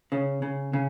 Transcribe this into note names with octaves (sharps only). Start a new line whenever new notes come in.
C#3
C#3
C#3